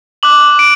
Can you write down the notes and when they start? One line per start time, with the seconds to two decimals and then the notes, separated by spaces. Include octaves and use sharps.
0.23 D6 F#6 F#7
0.59 D7